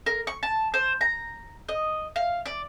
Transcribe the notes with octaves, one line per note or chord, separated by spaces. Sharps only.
A#4
C#6
A5
C5
A#5
D#5
F5
D5